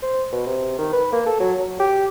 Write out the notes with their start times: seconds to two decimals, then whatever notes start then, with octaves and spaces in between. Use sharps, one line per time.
0.03 C5
0.32 B2
0.46 C3
0.79 D#3
0.93 B4
1.12 A#3
1.26 A4
1.40 F#3
1.59 F#3
1.80 G4